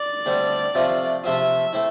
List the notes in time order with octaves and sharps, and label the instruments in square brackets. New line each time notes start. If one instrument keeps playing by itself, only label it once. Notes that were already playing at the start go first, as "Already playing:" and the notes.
Already playing: [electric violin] D5
[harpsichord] D2 D3 G3 C4
C3 F3 A3 C4 F4
[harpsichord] C3 F3 A3 C4 F4 [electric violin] E5
[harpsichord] A3 C4 E4